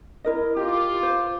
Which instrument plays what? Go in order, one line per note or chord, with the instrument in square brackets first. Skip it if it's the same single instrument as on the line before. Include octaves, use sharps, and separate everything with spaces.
[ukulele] E4 A#4 D#5
[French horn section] F4 [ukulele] G4 [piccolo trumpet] D6
[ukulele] C5